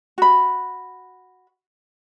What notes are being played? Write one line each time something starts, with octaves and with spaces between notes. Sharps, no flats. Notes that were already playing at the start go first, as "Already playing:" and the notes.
F#4 B5